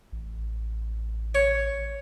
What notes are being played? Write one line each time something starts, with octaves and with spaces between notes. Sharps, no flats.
A1
C#5